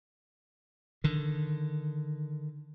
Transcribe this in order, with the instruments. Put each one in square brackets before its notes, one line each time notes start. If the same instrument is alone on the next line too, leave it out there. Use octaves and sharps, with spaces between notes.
[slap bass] D3 D#3